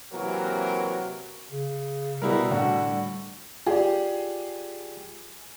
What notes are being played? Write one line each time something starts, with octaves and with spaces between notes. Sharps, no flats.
C3 E3 F#3 A#3 F#4 A#4
C#3
B2 G3 E4 A#4
A2 D3 F#4
F4 G4 G#4 D5